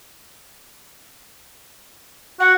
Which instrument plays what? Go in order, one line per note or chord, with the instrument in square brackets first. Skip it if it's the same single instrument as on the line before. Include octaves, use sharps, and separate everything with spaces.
[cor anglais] F#4 [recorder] F#5